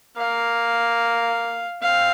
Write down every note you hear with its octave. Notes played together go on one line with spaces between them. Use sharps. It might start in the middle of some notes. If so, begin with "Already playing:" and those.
A#3 F5
C4 F5